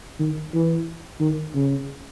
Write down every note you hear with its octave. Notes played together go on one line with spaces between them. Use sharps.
D#3
E3
D#3
C#3